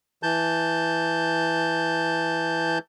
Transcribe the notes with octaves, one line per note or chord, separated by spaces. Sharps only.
E3 A5 G6